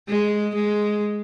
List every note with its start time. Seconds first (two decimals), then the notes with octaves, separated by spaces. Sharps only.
0.09 G#3
0.55 G#3